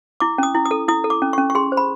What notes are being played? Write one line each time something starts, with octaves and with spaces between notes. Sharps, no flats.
E4 D6
C#4 D#6
E4
D#6
A4
E4 D#6
A4
D6
C#4
C#4 C#6
C#6
G#4 C6
C5
B5